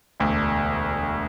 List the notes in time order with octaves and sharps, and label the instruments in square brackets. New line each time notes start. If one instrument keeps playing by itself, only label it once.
[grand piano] E1 D2